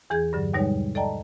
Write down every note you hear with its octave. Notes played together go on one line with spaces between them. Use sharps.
E2 E3 G#4 G6 G#6
G2 D3 F#3
D#2 B2 G3 G#3 D#4 C#5
A4 D5 D#5 G5 A5 A#5